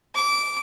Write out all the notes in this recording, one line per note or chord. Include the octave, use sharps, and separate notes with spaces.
D6